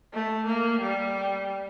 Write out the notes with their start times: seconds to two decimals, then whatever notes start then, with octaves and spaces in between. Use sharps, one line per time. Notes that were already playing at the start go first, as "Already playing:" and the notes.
0.13 A3
0.47 A#3
0.80 G3